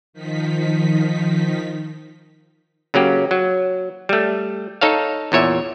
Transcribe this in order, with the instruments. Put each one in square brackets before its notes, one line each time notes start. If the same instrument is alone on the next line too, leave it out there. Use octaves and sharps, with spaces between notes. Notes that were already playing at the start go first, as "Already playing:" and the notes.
[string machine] D#3 F3 D#4 B6
[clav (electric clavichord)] C#3 F#3 A#3 G4
F#3
G3 A3
D#4 A4 C#5 F5
E2 A#2 C#5 E5